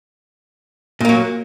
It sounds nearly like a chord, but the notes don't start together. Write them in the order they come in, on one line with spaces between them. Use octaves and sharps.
A#2 A#3 F#3